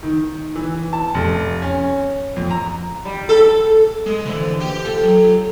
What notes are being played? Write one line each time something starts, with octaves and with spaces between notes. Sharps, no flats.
D#3
E3
A5
F1
C#4
F2
A#5
G3
A4
G#3
D3 E3 F3 D4
D#2 G4 G5
F4 A4
F#3